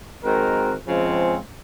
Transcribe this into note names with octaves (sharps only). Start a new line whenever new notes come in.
D#3 G#3 C4 F#4 A#4
C#3 F3 G#3 C4